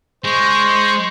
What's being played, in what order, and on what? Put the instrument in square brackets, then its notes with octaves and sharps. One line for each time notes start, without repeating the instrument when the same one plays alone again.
[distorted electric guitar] G#3 [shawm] C5 [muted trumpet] C#6